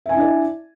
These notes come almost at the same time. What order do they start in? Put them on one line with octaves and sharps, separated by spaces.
E5 G#5 E4 D4 D5